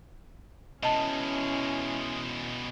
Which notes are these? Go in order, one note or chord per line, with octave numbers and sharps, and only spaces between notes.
B2 G#3 C#4 E4 D#5 A5